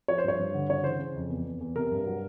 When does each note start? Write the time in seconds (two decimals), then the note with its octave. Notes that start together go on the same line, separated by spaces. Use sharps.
0.08 F3 C#5
0.18 C5
0.24 G2 C#5
0.39 G2
0.54 D3
0.69 C#3 C#5
0.84 E3 C5
0.99 C#3
1.15 F2
1.30 E2
1.45 E2
1.61 E2
1.75 C3 A#4
1.92 G2
2.06 F#3